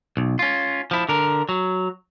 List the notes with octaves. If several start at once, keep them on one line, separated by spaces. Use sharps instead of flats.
B1
C#4 F4
F3 E4
D3 A#4
F#3